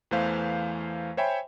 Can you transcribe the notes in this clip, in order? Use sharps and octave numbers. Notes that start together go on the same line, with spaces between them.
E2 E3 A3 C5 F5
C5 C#5 E5 G5 G#5 B5